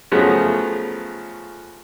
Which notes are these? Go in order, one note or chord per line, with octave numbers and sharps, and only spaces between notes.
C#3 F3 F#3 A3 B3